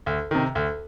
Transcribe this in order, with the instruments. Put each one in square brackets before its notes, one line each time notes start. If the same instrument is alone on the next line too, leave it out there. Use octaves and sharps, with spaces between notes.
[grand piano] D2
C3 D#3
D2